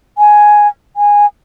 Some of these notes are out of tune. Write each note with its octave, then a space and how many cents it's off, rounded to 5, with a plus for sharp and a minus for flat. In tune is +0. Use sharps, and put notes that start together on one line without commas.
G#5 +5
G#5 -10